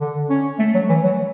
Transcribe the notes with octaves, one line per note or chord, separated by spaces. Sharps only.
D3
C#4
A3
F#3
E3
F#3